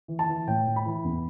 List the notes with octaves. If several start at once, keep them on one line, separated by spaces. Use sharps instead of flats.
E3
A5
E3
A2 G5
A2
B5
E3
E2